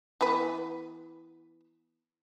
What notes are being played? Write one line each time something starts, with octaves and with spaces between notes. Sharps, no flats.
E3 B3 B4